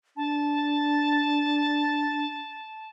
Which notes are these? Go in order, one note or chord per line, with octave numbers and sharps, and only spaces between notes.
D4 A5